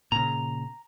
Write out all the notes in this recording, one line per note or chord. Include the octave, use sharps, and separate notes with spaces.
A#2 C#3 A#5